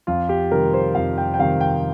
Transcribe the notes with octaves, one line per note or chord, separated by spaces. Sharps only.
F2 F4
G4
C3 D#3 G3 A#4
C5
F2 F5
G5
G5
C3 D#3 G3 F5
G5